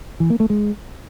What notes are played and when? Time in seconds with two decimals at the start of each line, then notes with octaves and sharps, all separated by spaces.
0.20 E3
0.30 A#3
0.40 A3
0.50 G#3